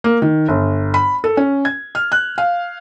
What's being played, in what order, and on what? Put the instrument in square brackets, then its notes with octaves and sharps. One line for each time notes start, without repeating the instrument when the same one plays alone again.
[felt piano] A#3
D#3
G1
B5
A4
C#4
G#6
F6
F#6
F5